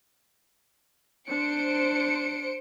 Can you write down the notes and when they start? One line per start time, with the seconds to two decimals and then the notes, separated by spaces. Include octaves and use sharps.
1.29 D4 C5 C#7 D7